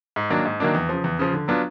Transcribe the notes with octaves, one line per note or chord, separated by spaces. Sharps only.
G#2
D#3 F#3 A#3 D4
G#2
D#3 F#3 A#3 D4
E2
C#3 F3
E2
C#3 F3
D3
F#3 B3 D4 F4